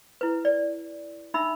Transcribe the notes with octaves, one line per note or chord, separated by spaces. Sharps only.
E4 B4
D5
D4 D#4 E5 B5 E6